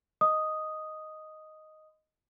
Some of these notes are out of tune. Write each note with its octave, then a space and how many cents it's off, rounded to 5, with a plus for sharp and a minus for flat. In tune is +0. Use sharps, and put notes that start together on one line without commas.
D#5 +0 C6 -35 D#6 +0